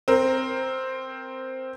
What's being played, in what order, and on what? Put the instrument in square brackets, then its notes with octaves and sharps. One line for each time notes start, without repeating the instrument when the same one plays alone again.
[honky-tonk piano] C4 A#4